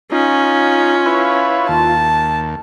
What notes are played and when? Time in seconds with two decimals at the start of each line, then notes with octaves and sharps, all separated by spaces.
0.12 C#4 D#4 F4
1.06 E4 B4 C#5
1.68 D#2 A5